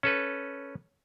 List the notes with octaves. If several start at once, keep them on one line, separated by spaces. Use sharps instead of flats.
C#4 A4 B4